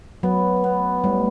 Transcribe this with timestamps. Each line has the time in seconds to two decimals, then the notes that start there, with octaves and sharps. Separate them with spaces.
0.23 F#3 B3
0.64 B3
1.03 A2 G3